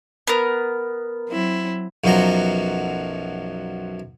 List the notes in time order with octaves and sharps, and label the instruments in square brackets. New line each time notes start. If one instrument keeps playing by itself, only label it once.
[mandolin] B3 A#4
[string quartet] F#3 C4 E4
[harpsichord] B1 F#2 B2 F3 F#3 A#5